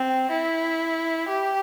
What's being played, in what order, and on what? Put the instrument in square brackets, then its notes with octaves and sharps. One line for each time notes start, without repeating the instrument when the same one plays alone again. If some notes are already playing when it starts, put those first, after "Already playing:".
Already playing: [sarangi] C4
E4
G4